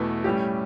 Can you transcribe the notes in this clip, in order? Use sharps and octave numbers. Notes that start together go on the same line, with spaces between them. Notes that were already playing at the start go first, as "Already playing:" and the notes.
Already playing: E2 B2 A3 E4 A4
A2 G3 C#4 G4